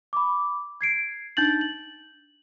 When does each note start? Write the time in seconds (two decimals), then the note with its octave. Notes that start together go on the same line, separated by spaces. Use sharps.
0.13 B5 D6
0.81 G#6 C7 D7
1.37 D4 D#4 G6 A6 F#7
1.61 F#7